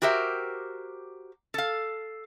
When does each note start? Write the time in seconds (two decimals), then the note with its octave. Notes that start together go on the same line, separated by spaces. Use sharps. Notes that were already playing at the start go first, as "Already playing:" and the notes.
0.02 F#4 G4 A#4 C5 E5
1.54 A4 F5